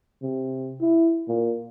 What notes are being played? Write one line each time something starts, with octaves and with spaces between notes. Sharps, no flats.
C3
E4
A#2